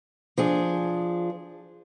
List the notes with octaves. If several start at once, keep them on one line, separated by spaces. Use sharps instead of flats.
F3 D4 G#4